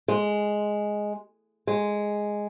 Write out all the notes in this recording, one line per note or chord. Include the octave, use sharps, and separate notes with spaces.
G#3
G#3